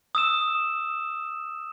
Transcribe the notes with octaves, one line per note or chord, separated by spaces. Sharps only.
D#6 E6 E7